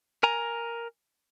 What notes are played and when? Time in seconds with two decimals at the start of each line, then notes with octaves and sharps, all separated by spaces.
0.23 A#4 G#5 A#5